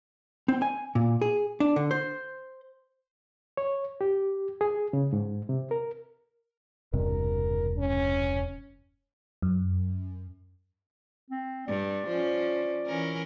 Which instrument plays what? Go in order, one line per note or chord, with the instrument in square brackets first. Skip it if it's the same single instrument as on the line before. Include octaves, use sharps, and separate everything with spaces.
[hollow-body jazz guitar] C4
G#5
A#2
G#4
D4
D3
C5
[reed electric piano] C#5
G4
G#4
C#3
G#2
C3
A#4
[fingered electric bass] E1 G2 C3 [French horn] A#4
[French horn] C#4
[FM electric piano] F#2
[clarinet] C4
[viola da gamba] G2 [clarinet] D5
[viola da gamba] F3 C#4
E3 C#4 A#4